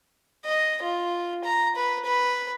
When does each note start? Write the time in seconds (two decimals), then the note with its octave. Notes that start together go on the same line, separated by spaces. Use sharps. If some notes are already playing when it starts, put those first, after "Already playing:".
0.45 D#5
0.83 F4
1.45 A#5
1.76 B4
2.05 B4